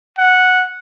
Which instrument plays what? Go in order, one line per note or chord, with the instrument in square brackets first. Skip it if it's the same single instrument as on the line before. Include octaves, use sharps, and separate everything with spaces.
[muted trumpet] F#5